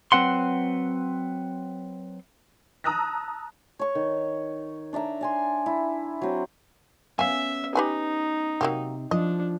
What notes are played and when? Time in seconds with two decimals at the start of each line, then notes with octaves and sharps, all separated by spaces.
0.12 F#3 C4 B4 F#5 C6
2.84 A5 A#5 D#6 E6 F#6 A#6
3.79 C#5 C#6
3.95 D#3
4.93 D4 D5 E5 A#5
5.21 D5 G#5 C6
5.66 E4
6.22 F#3 C4
7.19 B3 C#4 E5 F5 G#5
7.75 D#4 G4 B4 G#5
8.61 C3 F#3 A#3 G4
9.11 F3 D4 D#5